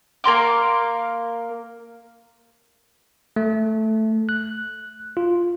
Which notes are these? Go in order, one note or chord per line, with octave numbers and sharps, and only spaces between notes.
A#3 A#4 C6 D6
A3
F#6
F4